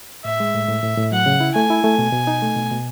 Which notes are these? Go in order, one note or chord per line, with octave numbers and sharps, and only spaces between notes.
A2 E5
G#3
A2
A2
A2
A2
F#3 F#5
C#3
E4
A3 G#5
E4
A3
B2
B2
D#4
A3
B2
B2